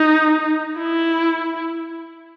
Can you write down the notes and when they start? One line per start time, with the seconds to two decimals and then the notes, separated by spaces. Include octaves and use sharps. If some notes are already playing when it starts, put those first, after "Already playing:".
Already playing: D#4
0.79 E4